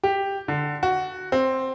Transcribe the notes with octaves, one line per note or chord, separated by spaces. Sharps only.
G4
D3
F#4
C4